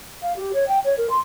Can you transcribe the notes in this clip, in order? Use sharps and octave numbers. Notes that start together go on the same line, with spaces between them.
F5
G4
C#5
G5
C#5
A#4
C6